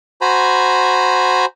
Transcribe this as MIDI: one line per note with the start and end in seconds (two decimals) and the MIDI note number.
0.21 1.45 66
0.21 1.45 72
0.21 1.45 80
0.21 1.45 82
0.21 1.45 83